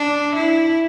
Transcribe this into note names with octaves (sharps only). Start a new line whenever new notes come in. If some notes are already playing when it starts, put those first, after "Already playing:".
Already playing: D4
E4